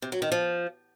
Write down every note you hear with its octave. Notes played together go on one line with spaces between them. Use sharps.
C3
F#3
D#3
F3